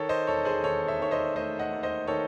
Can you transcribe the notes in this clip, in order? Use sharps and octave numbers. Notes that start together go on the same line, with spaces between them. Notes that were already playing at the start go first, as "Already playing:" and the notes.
Already playing: D#3 A4 C#5
C5 D#5
E1 A4 C#5
G#4 C5
D#2 A4 C#5
C#5 E5
D#3 C#5
C5 D#5
A3 C5 D#5
D#5 F#5
D#2
C5 D#5
D#3 A4 C#5